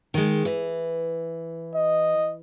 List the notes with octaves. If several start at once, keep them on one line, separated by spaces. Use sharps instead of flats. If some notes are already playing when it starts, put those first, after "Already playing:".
D#3 G#3
E3
D#5